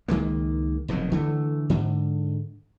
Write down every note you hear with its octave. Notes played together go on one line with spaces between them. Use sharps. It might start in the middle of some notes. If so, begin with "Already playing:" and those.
C#2 D#3 G#3 A#3
F1 B2 D#3 F#3
D3 E3 A3
G#2 D3